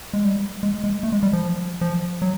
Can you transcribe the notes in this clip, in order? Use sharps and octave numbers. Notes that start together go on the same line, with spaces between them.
G#3
G3
G#3
G#3
A3
G#3
G3
F3
F3
F#3